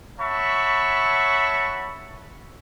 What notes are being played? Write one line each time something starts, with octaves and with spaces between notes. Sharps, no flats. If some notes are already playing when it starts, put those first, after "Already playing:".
C#5 E5 F#5 A5 B5 C#6